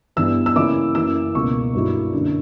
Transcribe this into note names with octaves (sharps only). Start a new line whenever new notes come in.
G2 E3 G3 B3 E6
E6
C#3 E3 A#3 C#4 E4 D6
F#2 E3 A#3 E6
C#2 B2 A#3 C#6
G2 F#3 A#3 E4
F#2 D3 A#3 D4